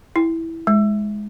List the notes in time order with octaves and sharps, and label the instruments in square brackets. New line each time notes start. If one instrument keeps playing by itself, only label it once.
[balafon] E4
G#3